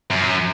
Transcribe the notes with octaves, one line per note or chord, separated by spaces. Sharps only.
F#2